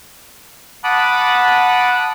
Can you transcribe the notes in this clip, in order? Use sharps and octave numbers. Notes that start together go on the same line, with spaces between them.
F#5 A5 B5 D6 D#6 F#6